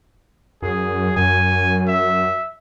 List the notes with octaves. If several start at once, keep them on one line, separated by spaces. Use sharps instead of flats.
F#2 G#4
F#2 G#5
E5